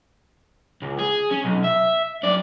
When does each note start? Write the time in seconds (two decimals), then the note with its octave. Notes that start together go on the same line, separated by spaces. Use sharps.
0.82 C#2
0.99 G#4
1.31 C#4
1.44 B1
1.64 E5
2.23 F#2 D5